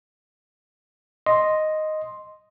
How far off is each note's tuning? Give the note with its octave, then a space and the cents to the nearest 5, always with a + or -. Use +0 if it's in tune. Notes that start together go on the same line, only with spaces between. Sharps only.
D#5 +0 C6 +0